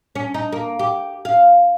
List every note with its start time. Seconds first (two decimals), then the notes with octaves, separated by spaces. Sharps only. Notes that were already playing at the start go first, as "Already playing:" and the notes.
0.15 C#4
0.34 D#4
0.52 A#3
0.79 G4
1.25 F5